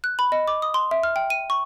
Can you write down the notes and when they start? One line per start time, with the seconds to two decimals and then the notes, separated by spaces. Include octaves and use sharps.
0.04 F#6
0.19 B5
0.32 D#5
0.48 D6
0.62 D#6
0.74 C6
0.91 E5
1.04 F6
1.16 G5
1.30 D#7
1.50 C#6